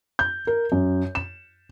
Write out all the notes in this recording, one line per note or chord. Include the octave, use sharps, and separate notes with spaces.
G6
A#4
F#2
E7